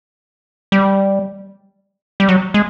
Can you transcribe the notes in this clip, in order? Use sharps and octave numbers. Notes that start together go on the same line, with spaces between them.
G3
G3
F#3
G#3